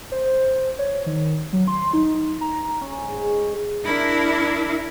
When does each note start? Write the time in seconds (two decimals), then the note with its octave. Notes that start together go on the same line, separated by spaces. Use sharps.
0.12 C5
0.79 C#5
1.06 D#3
1.53 F#3
1.68 C6
1.93 D#4
2.41 A#5
2.81 C#4
3.02 G#2
3.16 G#4
3.86 D4 E4 A#4